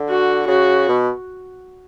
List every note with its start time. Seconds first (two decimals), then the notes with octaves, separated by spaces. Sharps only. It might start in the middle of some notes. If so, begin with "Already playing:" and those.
Already playing: D3
0.09 F#4
0.48 C#3 F#4
0.89 B2